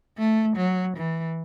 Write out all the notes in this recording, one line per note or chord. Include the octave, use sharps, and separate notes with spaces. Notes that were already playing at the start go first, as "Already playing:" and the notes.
A3
F#3
E3